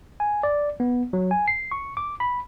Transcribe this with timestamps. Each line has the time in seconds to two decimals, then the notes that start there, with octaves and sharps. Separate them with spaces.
0.20 G#5
0.43 D5
0.80 B3
1.13 F#3
1.31 G#5
1.48 C7
1.72 C#6
1.97 D6
2.20 B5